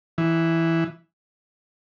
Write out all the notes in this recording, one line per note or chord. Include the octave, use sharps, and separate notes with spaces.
E3